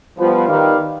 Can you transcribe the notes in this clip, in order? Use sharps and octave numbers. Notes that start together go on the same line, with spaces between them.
F3 G3 B3 F4 B4
D#3 D#4 G4 B4 D5 F5